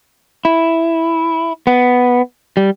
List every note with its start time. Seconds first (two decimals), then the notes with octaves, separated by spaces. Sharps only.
0.45 E4
1.67 B3
2.57 G3